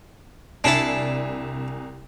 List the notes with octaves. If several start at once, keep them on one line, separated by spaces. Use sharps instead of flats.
C2 D4 E4 G#5 A5 C7